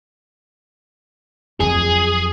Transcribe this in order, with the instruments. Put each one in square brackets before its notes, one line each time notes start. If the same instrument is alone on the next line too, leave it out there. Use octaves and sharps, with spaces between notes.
[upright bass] F2 F#3 [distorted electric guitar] G#4